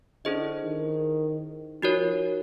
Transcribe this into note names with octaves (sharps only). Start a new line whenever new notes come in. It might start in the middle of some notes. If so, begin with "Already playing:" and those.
D3 C#4 E4 G#4 C5 D#5
D#3
F3 D#4 F#4 A#4 C#5